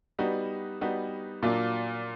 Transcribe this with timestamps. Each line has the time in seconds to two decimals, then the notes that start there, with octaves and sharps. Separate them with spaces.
0.19 G3 B3 D#4 F#4
0.81 G3 B3 D#4 F#4
1.43 A#2 F#3 A#3 D4 F4